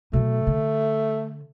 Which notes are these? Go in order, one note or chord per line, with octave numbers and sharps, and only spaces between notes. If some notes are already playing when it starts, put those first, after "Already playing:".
B2 F#3 A3
D3